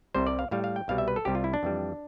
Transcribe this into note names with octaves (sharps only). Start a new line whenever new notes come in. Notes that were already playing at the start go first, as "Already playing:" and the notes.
C2 C3 G3 C5
D5
F5
A2 G3 F5
F5
G5
C2 B2 G3 F5
E5
B4
A4
C2 C3 G3 G4
F4
E4
D4
F2 E3 G3